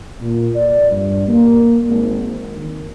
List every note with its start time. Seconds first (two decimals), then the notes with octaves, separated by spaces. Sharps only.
0.21 A#2
0.56 D5
0.91 G2
1.28 A#3
1.89 G#1
2.30 D#3
2.60 D#3